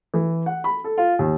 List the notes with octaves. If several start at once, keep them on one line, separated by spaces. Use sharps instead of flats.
E3
F#5
B5
A4
F4
D#2